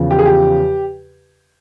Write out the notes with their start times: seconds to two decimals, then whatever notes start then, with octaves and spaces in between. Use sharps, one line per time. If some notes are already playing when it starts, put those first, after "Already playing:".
Already playing: E2 C#3 F3
0.11 G4
0.19 G#4
0.26 G4